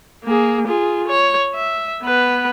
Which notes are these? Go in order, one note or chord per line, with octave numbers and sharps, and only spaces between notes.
A#3 G#4
F4 G#4
C#5
E5
B3 B4